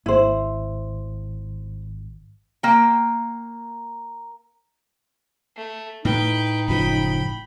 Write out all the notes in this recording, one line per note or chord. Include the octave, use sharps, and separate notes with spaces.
G#1 E4 C5
A#3 G5
A3
A2 A3 D#4 B4 G5
F#1 C#3 F3 G5 B5